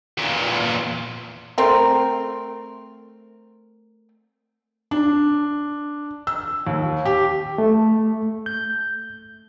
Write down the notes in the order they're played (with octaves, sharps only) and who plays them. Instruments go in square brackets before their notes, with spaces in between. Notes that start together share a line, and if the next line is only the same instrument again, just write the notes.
[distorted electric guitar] E2 A#2
[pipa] A3 C4 A#4
[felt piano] D4
E6
D#2
G4
[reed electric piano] A3
G6